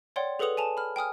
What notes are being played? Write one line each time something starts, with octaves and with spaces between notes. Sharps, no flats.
C#5 D5 F#5 G5 C6
G#4 A4 B4 F#5 D#6 F7
G#5 A5 F7
B5 F6
G5 G#5 D#6 F6